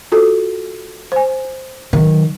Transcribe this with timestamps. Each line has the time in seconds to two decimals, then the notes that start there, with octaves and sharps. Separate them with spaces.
0.12 F4 F#4 A4
1.12 C5 G#5
1.93 D#3 F#3